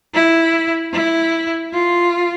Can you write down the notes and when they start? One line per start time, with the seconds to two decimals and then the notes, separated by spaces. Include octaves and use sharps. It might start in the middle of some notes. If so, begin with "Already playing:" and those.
0.14 E4
0.93 E4
1.73 F4